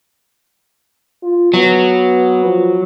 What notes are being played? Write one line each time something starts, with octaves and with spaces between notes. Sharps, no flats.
F4
F#3 B3
F3